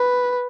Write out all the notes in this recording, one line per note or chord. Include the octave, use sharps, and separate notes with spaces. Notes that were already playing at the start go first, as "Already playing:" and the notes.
Already playing: B4